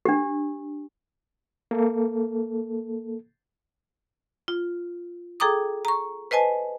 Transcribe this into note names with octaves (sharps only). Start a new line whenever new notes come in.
D4 G4
A#3 A4
F4
G#4 A4 G5 A#5 D6 D#6
A#5 C#6
B4 C5 D#5 G#5 A5